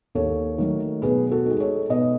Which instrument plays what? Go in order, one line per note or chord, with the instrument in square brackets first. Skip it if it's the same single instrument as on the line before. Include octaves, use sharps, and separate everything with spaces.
[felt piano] D#2 A4 C#5
D#3 F#3 A3
B2 G#4 B4
F#4 A4
G#3 D#4
A4 C#5
B2 B4 D#5